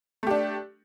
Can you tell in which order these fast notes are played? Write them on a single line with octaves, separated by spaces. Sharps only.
A3 G4 D4